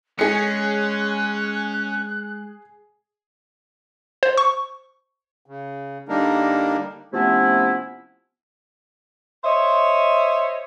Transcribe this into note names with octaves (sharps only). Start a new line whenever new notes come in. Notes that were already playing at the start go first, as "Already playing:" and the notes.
G#3 C#4 G#4 F#6 C#7
C5
C#6
C#3
D3 G3 A#3 D4 D#4 A#4
C3 F3 A3 B3 C#4 E4
C5 C#5 D#5 E5